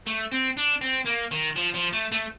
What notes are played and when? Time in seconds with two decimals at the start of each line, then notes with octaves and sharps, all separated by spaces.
0.07 A3
0.32 C4
0.57 D4
0.81 C4
1.06 A#3
1.31 D#3
1.56 F3
1.74 F3
1.93 A3
2.12 A3